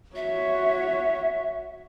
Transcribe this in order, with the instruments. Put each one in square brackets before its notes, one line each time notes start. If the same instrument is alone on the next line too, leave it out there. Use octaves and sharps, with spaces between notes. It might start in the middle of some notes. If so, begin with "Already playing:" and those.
[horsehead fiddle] F#4 C#5 [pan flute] E5